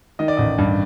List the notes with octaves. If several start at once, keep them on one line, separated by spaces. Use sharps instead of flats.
D#3 D#5
D5
A1 D#5
G2